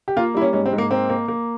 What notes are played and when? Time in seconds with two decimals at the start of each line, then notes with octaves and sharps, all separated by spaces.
0.08 G4
0.16 A#3 F4
0.34 G3 E4
0.41 C#4
0.53 G#2 C#4
0.66 C4
0.73 G#2
0.78 A#3
0.91 A#3 C4
1.09 A#3
1.28 A#3